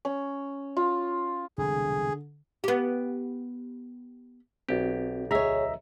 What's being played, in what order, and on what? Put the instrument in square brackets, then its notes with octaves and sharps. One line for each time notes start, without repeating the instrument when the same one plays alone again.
[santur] C#4
F4
[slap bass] E1 C2 [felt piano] D3 [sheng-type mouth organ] G#4
[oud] B3 G4
[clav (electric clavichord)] B1 G4 [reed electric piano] C4 F#4
[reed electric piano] D2 [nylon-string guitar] G#4 C#5 [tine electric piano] D#5 E5 A#5